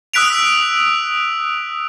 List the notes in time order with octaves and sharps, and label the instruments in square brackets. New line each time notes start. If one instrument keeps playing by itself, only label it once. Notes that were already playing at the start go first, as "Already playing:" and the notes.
[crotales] D#6 E6 F#6 B6 D7 F7